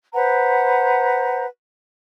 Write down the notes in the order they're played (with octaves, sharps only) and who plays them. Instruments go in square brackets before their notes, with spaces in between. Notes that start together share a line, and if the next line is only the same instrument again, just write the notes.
[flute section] B4 C5 F#5 A#5